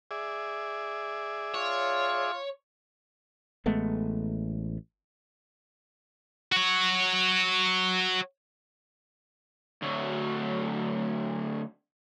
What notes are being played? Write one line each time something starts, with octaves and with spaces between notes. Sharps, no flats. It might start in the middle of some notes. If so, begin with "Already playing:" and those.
G#4 D5 E5
F4 C#5
A1 G#3 A3 B3
F#4 C#5
D2 F#3